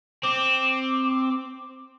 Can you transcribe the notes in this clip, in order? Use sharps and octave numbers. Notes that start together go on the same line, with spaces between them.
C4 D6